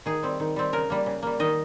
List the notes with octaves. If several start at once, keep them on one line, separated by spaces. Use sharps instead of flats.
D#3 G#4
G3 C4
D#3
G3 C4
C#3 A#4
G3 A#3
C#3
G3 A#3
D#3 D#5